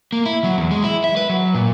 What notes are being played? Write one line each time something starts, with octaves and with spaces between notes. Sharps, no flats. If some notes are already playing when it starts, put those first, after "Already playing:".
A#3
E4
F#3
E2
G#3
E4
E5
B4
F#3
A#2